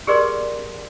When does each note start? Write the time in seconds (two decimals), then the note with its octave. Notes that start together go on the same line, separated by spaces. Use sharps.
0.07 G4 G#4 A#4 B4 D5 C6